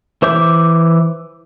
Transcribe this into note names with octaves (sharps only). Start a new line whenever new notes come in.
E3 C5 E5 D6 G6